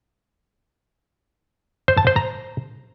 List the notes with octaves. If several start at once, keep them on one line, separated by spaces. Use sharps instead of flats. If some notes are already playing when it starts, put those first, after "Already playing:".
C5
A5
C5
A#5